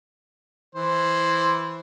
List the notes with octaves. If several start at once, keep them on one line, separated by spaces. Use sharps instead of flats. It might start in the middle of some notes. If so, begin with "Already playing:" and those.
E3 C5